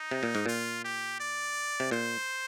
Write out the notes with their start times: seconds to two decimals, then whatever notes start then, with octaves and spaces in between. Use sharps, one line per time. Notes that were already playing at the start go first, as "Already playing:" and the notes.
Already playing: D#4
0.11 C3
0.23 A#2
0.35 G#2
0.46 A#2 F4
0.84 G4
1.20 D5
1.80 C3
1.91 A#2 C5